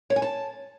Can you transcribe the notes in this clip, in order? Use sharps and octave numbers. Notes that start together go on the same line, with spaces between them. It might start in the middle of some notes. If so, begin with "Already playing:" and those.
C#5
G#5
A5